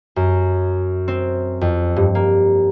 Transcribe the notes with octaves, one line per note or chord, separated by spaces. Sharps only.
F#2
C4
F2
G2
A#3